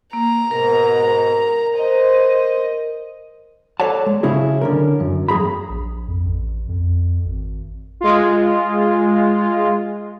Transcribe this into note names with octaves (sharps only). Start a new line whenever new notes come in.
A#3 A#5
G#2 B2 A#4
C5 D#5
A4 C#5 D5 F#5 A5
G#3
C#3 F#3 C#4 E4 F#4 G#4
D3 C#4 A#4
F#2
E2 G2 G#4 A#5 B5
A#1
F2
A1
F2
G#1
G#3 F4